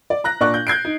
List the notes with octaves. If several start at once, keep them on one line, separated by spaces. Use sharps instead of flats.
D5
A#5 F#6 A#6
A#2 D4 D5 C#6 F#6
G6
G6 G#6 C7 D7
D#4